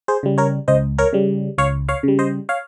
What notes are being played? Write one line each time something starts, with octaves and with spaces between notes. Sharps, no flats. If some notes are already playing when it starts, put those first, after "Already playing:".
G#4 C5
C#3 G3
A#4 C#5
C#2 C5 D#5
A#4 C#5
C#3 G3
C#2 C#5 F5
C#5 F5
C#3 G3
C5 D#5
C#5 F5